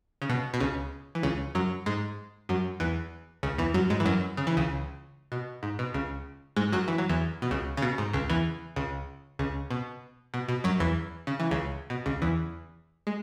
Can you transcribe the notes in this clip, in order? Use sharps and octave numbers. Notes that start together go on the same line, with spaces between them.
C#3
B2
B2
C#2 C#3
E3
C#2 C#3
F#2 F#3
G#2 G#3
F#2 F#3
E2 E3
C#2 C#3
E2 E3
F#2 F#3
G#2 G#3
E3
F#2 F#3
C#3
E3
C#2 C#3
B2
G#2
B2
C#2 C#3
G#2 G#3
F#2 F#3
E3
F#3
E2 E3
B2
C#2 C#3
C#3
B2
G#2
C#2 C#3
E2 E3
C#2 C#3
C#2 C#3
B2
B2
B2
F#2 F#3
E2 E3
C#3
E3
C#2 C#3
B2
C#2 C#3
E2 E3
G#3